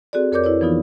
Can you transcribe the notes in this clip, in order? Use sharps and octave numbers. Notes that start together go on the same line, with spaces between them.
C4 F#4 G#4 A4 D5
F2 A#4 C#5 D5 D6 G6
E4 B4 C#5 D5
E3 F3 B3 D#4 F4